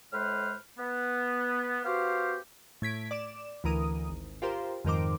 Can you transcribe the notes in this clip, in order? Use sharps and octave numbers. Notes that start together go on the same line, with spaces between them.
A2 G#3 B4 C5 F6
B3
B3 F#4 G4 C5 F5
A2 G#6 B6 D7
D5 D6 E7
D2 E3 A#4 D#6
G#1
F4 G4 A#4 C5
F2 G#2 D#3 A#4 C5 D6